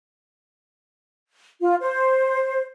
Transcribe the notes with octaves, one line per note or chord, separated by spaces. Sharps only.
F4
C5